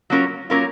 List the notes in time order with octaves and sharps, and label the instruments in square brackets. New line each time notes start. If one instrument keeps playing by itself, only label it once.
[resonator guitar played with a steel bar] F#3 A#3 C#4 F4 A#4
F#3 A#3 C#4 F4 A#4